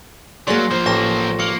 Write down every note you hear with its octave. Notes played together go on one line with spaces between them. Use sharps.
F#3 A#3 G#4 D5 C6 A#6
F3 A#3 C5
A1 C#6 A#6 E7
A#3 C#7